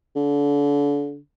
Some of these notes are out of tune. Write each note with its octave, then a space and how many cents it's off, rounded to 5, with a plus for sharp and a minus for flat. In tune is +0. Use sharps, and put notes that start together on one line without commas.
D3 -35